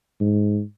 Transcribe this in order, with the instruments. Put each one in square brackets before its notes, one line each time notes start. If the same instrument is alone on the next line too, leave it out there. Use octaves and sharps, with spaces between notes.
[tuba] G#2